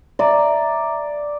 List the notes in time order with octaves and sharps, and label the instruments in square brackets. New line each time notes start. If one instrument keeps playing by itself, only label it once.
[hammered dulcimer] D5 [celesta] E5 A#5